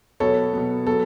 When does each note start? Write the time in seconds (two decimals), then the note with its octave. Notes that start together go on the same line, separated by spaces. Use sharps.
0.20 B2 F#3 B3 A4 C#5
0.53 B2 F#3 B3
0.86 F#3 B3 A4